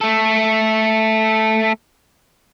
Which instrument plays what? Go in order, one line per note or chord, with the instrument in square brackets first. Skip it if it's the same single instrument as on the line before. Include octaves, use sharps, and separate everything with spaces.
[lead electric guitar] A3 A4